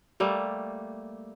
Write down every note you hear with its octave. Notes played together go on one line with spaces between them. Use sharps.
G3 A3 A#3